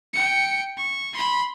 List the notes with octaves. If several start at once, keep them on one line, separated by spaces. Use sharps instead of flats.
G5 C#7
C#6
B5 C6